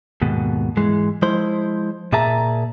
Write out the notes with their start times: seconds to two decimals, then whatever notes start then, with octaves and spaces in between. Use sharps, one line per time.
0.22 D#2 G#2 B2
0.77 G#2 E3 G#3
1.22 F3 G#3 E4 C5 C6
2.13 A#2 G#4 E5 A5 A#5